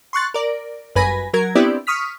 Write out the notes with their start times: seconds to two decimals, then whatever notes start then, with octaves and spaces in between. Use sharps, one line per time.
0.13 C6 C#6 F#6 A6
0.34 A#4 D5
0.95 G1 F#2 B4 G#5 B5 A#6
1.33 F#3 A#4 G#6
1.55 B3 C4 D4 E4 G4 D5
1.87 C#6 D#6 F6 B6